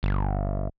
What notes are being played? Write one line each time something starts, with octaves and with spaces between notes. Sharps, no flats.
G1